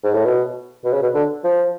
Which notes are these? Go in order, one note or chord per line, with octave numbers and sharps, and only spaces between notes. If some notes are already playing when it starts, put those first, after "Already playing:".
G#2
A2
B2
B2
C#3
B2
D3
F3